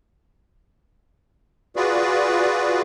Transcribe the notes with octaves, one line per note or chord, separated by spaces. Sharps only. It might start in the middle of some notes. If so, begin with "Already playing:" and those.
F4 F#4 G#4 B4 D5